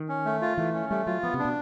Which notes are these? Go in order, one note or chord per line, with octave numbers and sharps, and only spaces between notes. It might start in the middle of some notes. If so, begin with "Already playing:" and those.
Already playing: D#3
C#4
A3
F4
E3 A3
C#4
G3 A3
F#3 F4
F3 B3
C3
D4
B2